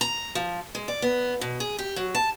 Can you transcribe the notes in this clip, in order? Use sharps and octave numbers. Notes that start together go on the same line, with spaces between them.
A#5
F3
G#3
D5
B3
B2
G#4
G4
F#3
A5